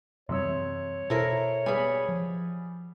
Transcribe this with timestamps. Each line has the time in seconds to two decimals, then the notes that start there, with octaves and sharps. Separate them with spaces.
0.29 F#2 C3 E3 G3 C#5 E6
1.10 B2 E4 A4 A#4 C5
1.66 G3 B3 G#4 G#5 B5
2.09 F3